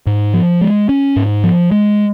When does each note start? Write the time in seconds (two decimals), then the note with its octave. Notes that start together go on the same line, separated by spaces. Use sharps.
0.07 G#2
0.34 F3
0.61 G#3
0.89 C#4
1.16 G#2
1.44 F3
1.71 G#3